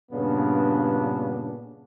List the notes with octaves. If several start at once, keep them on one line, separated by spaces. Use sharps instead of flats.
G2 A#2 C#3 B3 D4